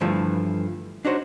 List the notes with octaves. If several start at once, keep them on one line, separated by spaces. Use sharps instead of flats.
G2 D3 E3 F3 A3
D4 D#4 F#4 C5 C#5